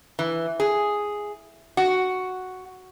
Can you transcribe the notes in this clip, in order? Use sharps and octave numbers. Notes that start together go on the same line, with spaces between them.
E3
G#4
F#4